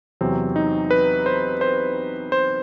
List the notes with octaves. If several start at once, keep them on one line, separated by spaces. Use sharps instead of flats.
E2 C3 F#3 C4
D#4
B4
C5
C5
C5